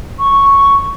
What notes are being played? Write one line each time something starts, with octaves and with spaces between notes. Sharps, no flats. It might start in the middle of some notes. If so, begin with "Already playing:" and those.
C#6